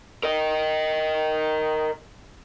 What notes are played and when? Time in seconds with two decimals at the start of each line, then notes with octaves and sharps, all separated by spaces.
0.23 A#4 D#5